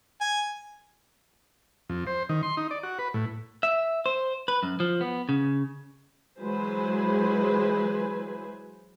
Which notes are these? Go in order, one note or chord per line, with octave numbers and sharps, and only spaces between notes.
G#5
F2
C5
D#3
C6
D#4
D5
F#4
B4
A2
E5
C5
B4
F#2
F3
B3
C#3
E3 F#3 G#3 B4 C5 G#5